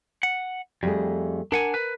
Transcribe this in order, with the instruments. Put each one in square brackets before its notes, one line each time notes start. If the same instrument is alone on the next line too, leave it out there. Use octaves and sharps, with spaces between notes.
[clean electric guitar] F#5
[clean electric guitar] F2 [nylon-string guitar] G3 A3 G#4
[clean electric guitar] D4 F#5 G#5 [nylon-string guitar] A#4
[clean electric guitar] B4